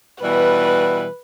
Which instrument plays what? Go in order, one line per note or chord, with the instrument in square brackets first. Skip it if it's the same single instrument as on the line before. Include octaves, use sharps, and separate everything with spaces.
[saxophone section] B2 E3 G3 [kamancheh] B4